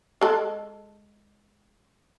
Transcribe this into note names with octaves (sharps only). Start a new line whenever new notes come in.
G#3 A4